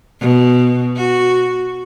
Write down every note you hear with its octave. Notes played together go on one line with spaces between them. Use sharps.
B2
F#4